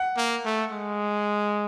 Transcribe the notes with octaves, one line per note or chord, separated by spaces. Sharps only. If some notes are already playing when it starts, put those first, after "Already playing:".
Already playing: F#5
A#3
A3
G#3